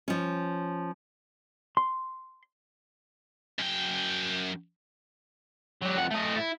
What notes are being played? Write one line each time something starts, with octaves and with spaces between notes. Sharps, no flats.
F3 C#4
C6
F#2 G5
F#3 G4
F2 F#5
A3 D#5
E4